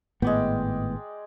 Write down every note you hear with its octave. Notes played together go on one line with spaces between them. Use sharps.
G#1 A2 G#3 B3 D5 G5